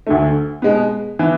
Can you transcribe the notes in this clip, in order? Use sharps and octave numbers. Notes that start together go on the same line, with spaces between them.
D2 D3 A3
B2 G#3 B3
E3 B3